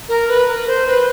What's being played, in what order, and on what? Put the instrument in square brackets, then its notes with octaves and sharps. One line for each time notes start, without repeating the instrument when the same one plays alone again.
[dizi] A#4
B4
A#4
C5
B4